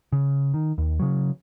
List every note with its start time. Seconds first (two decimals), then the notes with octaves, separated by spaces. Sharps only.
0.12 C#3
0.54 D#3
0.78 D#2
0.99 C#3 F#3